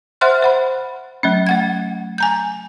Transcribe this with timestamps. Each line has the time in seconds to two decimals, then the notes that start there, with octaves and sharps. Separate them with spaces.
0.21 C5 E5 F#5 C6 F6 F#6
0.42 C5 F#5 B5
1.23 F#3 A3 C#4
1.47 A3 F#5 G#6
2.18 G#5 A#5 G6